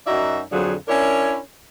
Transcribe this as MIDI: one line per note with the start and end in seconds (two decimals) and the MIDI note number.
0.07 0.41 42
0.07 0.41 63
0.07 0.41 66
0.07 0.41 74
0.07 0.41 76
0.52 0.75 41
0.52 0.75 50
0.52 0.75 53
0.52 0.75 54
0.52 0.75 68
0.88 1.39 61
0.88 1.39 62
0.88 1.39 64
0.88 1.39 70
0.88 1.39 73